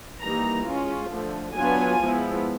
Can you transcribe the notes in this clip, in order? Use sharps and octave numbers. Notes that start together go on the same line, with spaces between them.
E3 G3 A#3 D#4 A#5
G#3 C#4 F4
D3 F3 A3
F#3 B3 D4 F4 G#5
F3 G#3 B3 E4